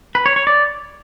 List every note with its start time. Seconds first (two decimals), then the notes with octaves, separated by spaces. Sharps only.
0.15 B4
0.26 C#5
0.36 C#5
0.47 D5